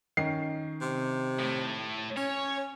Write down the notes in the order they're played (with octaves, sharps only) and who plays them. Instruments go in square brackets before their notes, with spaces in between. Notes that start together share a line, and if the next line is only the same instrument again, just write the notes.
[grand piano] D#3 C#4 C7
[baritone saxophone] C3
[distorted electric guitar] A2 A3
[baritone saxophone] C#4 [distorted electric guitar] C#5